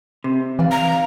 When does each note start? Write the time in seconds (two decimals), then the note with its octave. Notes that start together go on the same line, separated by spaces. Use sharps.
0.24 C3
0.59 E3 D#4 D5 F5
0.71 A#5